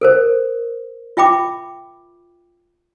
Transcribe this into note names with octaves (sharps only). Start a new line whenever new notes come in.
A4 A#4 C5
F4 E5 G5 B5 D6